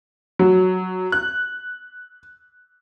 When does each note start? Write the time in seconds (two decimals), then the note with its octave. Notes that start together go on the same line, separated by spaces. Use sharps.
0.39 F#3
1.12 F#6